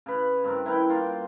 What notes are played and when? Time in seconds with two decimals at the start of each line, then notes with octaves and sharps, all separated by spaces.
0.06 C#3 B4
0.44 G2 C4 A#4
0.66 E4 A#4 B4 G5
0.90 A#3 F4